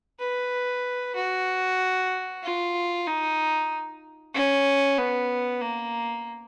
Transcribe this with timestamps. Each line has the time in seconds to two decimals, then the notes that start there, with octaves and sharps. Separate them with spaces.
0.19 B4
1.15 F#4
2.43 F4
3.07 D#4
4.34 C#4
4.98 B3
5.62 A#3